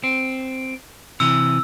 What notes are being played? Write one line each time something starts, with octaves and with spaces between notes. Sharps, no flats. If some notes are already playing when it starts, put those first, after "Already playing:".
C4
C3 E3 E6